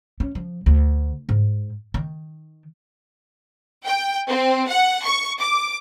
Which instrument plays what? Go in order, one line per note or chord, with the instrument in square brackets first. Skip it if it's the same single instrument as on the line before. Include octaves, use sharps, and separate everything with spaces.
[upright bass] C#4
F3
D2
G#2
D#3
[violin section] G5
C4
F#5
C#6
D6